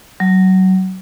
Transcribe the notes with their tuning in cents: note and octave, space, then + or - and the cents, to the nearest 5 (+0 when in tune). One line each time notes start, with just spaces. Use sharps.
F#3 +25